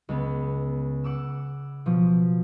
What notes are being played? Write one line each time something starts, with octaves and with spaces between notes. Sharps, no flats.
C#2 B3
F#5 D6 E6
B2 F3